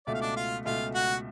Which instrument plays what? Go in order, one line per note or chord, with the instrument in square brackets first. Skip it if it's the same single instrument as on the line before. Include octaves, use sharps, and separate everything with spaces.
[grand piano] C#2 B2 A3 [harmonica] D5
[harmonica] F5
D4 D5
F4 F5
[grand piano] C#2 B2 A3 [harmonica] F4 F5
[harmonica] F#4 F#5